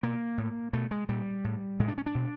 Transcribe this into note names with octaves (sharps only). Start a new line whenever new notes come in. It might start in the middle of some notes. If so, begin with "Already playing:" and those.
B2 A#3
A2
B2 A3
G#3
A#2 G3
A2
A2 G#3
D4
C#4
D4
B2